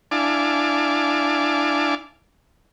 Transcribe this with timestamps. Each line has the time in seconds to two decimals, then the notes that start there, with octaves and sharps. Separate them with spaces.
0.11 D4 E4 F5 G#5 A5 D6